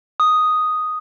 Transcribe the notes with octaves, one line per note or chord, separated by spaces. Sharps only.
D#6